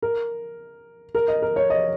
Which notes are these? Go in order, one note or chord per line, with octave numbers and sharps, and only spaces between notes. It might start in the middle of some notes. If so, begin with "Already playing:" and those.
A#4
A#4
D#5
A#4
C#5
D#5